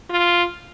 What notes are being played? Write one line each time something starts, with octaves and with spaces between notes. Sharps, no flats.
F4